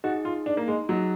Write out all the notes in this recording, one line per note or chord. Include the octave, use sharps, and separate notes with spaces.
D#4 F#4 G#4 D#5
F4
D4
A#3
G#3
F#3 D#4 G#4 D#5